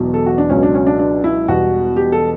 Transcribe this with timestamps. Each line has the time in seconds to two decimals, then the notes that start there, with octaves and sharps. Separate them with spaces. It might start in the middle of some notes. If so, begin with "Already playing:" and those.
Already playing: E1 E2 B2 F#3
0.14 A4
0.26 F#4
0.38 D4
0.50 C#2 B2 F#3 C#4
0.63 D4
0.75 C#4
0.87 D4
0.99 D4
1.24 E4
1.48 E1 E2 B2 G3 F#4
1.96 G4
2.12 A4